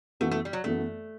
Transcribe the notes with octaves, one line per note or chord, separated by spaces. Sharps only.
F#2 E3 A3 B3 F#4 A4
A3
G3
F#3
F#2 E3 A3 B3 F#4 A4